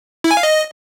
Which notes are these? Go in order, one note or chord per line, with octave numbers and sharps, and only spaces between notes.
E4
G#5
F5
D#5